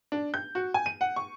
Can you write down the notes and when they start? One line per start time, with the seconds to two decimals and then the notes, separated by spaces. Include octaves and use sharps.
0.12 D4
0.34 G6
0.55 F#4
0.74 G#5
0.86 D#7
1.01 F#5
1.16 C#6